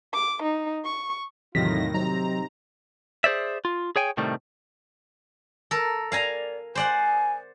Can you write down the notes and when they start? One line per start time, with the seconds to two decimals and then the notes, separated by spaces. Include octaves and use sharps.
0.13 D6
0.43 D#4
0.85 C#6
1.55 E2 A2 C3 D#3 F#3 F4 A#6 B6
1.94 C3 F#3 C4 D#4 A#5
3.24 G#4 C5 D5 E5
3.65 F4
3.96 G#4 C#5 G5 G#5
4.17 A2 C3 D#3 G3 A3
5.71 A4 A#4
6.12 D5 F5 G#5 A#5
6.75 C5 D5 F#5 G#5